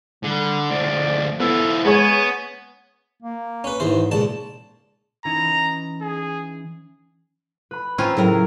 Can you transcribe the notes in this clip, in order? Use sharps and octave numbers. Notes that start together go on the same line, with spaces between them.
D3 G3
D2 F3 D5
F3 B3 E4 A4
G#3 B3 C#5 G#5
A#3
C#4 B4
D#2 G#2 E3 C5
C#2 A#2 A5
E3 C#4 D#4 A#5
G#4
B4 B5
C4 C#4 F4 A#5 E6 G#6
A2 C#3 F#3 A#4